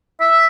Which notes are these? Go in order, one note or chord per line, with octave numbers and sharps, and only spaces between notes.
E5